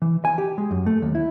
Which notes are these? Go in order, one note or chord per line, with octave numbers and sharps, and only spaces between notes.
E3
G#5
G4
G#3
F#2
A3
D#2
E4